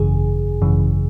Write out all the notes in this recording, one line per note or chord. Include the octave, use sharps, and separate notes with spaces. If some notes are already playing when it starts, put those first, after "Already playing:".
Already playing: G#1 F#2 C#3 E3 G#4
G#1 F#2 C#3 E3